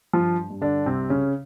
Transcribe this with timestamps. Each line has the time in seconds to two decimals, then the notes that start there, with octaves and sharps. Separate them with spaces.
0.13 G2 F3 F4
0.50 G2
0.61 D3 D4
0.86 C2 C3 C4
1.10 C#3 C#4